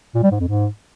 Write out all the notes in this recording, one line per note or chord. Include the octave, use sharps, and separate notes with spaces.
A#2
G3
G#2
F2
G#2